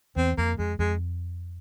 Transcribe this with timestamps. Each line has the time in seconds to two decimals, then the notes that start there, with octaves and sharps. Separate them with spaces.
0.16 E2 C4
0.38 F2 A#3
0.59 F2 G#3
0.79 F2 G#3